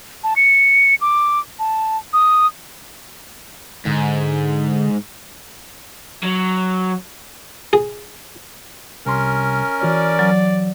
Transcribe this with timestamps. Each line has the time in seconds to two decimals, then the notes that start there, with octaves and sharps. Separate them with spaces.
0.24 A5
0.36 C#7
1.01 D6
1.59 A5
2.13 D#6
3.86 G#2 D3
6.23 F#3
7.73 G#4
9.06 C2 C#4 A#4 C6
9.82 E3 F#4 C#5 D5
10.19 F#3